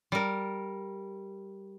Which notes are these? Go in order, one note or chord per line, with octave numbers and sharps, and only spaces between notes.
G3 A#4